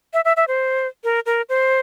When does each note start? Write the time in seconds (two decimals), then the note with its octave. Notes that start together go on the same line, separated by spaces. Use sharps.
0.14 E5
0.25 E5
0.37 E5
0.48 C5
1.04 A#4
1.26 A#4
1.49 C5